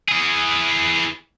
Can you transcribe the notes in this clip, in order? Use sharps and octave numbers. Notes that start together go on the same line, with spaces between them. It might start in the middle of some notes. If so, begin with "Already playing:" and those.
E3 G#4